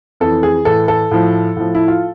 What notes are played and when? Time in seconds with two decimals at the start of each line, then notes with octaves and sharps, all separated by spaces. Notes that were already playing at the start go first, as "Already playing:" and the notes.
0.20 F2 E3 A4
0.43 G#4
0.65 A2 E3 A4
0.88 A4
1.11 A2 F3
1.57 A2 F3
1.75 E4
1.88 F4